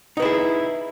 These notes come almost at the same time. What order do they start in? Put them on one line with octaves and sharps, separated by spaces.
D#4 B4 E4 G#4